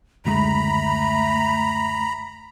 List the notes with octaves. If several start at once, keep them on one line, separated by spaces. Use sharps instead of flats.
F#1 D2 G#3 A3 A#5 B5